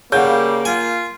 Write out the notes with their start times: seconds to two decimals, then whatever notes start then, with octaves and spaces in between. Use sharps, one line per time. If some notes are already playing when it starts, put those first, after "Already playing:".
0.12 C#3 G3 A#3 F5 F#5 G6
0.65 F4 G#5